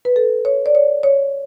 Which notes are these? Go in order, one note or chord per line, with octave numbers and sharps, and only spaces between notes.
B4
A4
C#5
D5
C#5
C#5